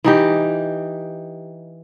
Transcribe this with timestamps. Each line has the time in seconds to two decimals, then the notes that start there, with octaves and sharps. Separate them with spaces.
0.04 E3 D#4 G4